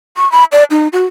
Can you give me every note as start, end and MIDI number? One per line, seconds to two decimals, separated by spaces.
0.17 0.30 85
0.32 0.44 83
0.52 0.64 74
0.71 0.88 63
0.93 1.05 66